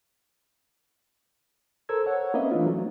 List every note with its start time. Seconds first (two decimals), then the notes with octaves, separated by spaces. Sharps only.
1.89 A4 A#4 C5 E6 G#6
2.06 C#5 F#5
2.34 A#3 C4 C#4 B4 D#5 E5
2.51 E3 A3 D4 F4
2.67 F#3